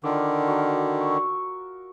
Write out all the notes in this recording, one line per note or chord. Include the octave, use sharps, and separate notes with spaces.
D3 D#3 F4 D5
F#4 A#4
C#6 E6